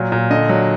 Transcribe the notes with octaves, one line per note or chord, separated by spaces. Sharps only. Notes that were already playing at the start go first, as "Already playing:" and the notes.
Already playing: A#2 F#3
A#2
D3 D#5
F#3